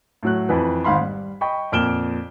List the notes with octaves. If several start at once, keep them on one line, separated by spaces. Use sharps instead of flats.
A2 F#3 F#6
F2 E3 B4
G#1 G#2 F5 B5 C6
G3
D#5 G5 B5 C#6
F2 A#2 F6 D7 E7 G7